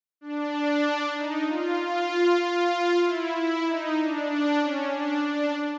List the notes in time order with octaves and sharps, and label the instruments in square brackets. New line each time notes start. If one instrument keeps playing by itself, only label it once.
[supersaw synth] D4
D#4
F4
F4
F4
E4
E4
D#4
D4
D4
C#4
D4
D4